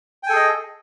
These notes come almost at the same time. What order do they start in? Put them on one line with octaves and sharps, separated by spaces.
G5 G#5 A4 G#4 D#5